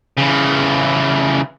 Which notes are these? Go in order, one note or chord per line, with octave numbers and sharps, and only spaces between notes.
C#3 E3